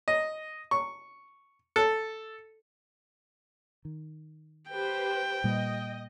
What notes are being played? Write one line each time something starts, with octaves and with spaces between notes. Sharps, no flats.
D#5
C#6
A4
D#3
G4 B4 C5 G5
A#2 G3 A#3 D#5